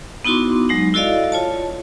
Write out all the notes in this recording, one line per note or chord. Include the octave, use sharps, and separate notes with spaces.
B3 D#4 E4 F#4 C6 D6
F#3 G#3 D#4
E4 F#4 A4 D5 D#5 F5
F4 C#5 A5